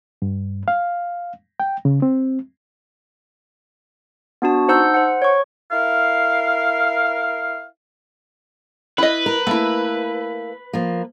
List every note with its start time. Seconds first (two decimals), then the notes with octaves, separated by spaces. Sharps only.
0.22 G2
0.68 F5
1.60 G5
1.85 C#3
2.02 C4
4.42 B3 D4 F#4 A5
4.68 D#4 C5 F#5 A5 E6 G6
4.94 C5 F#5
5.22 C#5 C#6
5.71 E4 A#4 F5
8.98 E4 B4 D#5
9.26 A#4
9.47 A3 A#3 E4
10.73 F3 A#3